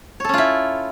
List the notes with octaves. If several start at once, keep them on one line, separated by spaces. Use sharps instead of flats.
C#4 E4 F4 A4 C#5